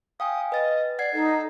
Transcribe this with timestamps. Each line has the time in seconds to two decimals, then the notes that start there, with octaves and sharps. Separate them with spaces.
0.20 F5 G5 G#5 D#6
0.52 B4 D#5 A6
0.99 D5 F#5 G#6 C7
1.13 D#4 A4